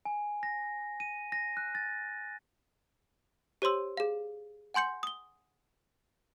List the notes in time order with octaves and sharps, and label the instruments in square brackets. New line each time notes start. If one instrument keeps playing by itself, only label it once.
[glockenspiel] G#5
A#6
D#7
A#6
F#6
A6
[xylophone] G4 C5 C#5 C6 E6
G#4 F5
F#5 G#5 C6 G6 C#7
D#6 G7